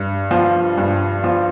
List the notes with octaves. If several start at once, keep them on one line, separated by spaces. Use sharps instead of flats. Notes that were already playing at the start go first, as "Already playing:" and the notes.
Already playing: G2
F3
G2
F3